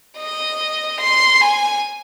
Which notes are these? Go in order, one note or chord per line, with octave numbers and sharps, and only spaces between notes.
D#5
C6
G#5